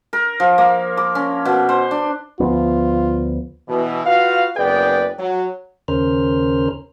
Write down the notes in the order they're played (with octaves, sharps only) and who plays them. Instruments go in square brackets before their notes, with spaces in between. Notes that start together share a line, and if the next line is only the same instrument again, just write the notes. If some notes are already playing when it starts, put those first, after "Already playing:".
[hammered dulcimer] A#4
F3
A#3
D6
C#4
B2
C5
D4
[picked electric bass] D2 F3 B3 [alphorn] F4
[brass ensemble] B2 E3
F4 F#4 B4 F5
F#1 B3 G#4 B4 D5 G5
F#3
[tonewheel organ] D#2 C#3 C#4 A#4 C5 F6